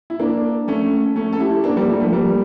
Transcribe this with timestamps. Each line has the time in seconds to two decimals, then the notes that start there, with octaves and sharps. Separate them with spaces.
0.10 E4
0.19 A#3 D4
0.68 A3 C#4
1.16 A3 C#4
1.33 A4
1.40 E4 G4
1.64 A#3 D4
1.76 G3 A#3
1.88 F3 A3
2.00 F3 A3
2.13 G3 A#3